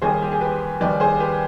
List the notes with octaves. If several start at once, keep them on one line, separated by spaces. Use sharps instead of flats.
D#2 D#3 G3 G#4 C5
G4
G#4
G4 B4
D#2 D#3 G3 B4 D5
G#4 C5
G4 B4